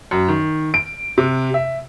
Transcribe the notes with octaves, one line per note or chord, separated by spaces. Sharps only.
F#2
D#3
D7
C3
E5